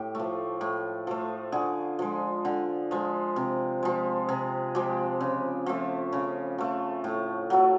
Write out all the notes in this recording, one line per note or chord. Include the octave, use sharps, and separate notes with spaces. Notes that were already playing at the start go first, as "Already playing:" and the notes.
Already playing: A2 G4
F3 A3
A2
F3 A3
D3 G#4
F3 G#3
D3
F3 G#3
C3
F3 G#3
C3 G#4
F3 G#3 G4
C#3
F3 A3
C#3
F3 A3
A2
F#3 A3